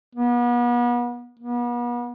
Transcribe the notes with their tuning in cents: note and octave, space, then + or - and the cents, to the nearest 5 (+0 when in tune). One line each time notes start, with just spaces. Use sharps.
B3 -35
B3 -40